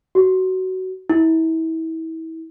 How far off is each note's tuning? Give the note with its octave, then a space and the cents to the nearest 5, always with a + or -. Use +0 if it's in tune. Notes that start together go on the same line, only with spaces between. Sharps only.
F#4 +15
E4 -35